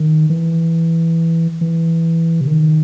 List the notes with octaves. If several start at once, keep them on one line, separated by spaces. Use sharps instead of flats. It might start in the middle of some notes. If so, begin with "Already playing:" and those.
Already playing: D#3
E3
E3
C3
D#3